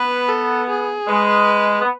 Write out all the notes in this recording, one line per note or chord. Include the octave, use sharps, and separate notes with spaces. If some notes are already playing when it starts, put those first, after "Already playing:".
Already playing: B3 B4
A4
G#4
G#3 B4
B3